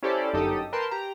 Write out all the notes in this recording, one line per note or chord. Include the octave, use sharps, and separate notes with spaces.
C#4 E4 G4 A4 C5 D5
G1 F#2 D#4 G4 A4 D#6
A#4 B4 G5 A5 C6
G4 A#5